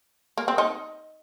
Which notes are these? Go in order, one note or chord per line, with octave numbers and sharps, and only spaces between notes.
A#3
C4
D#4